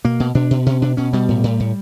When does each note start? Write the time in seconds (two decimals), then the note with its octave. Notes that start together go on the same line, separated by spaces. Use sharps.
0.04 B2 A#3
0.20 B2
0.35 B2 D4
0.51 B2
0.66 B2 C#4
0.82 B2 D4
0.97 B2 C#4
1.13 B2 G3
1.28 A2
1.44 A2
1.60 A2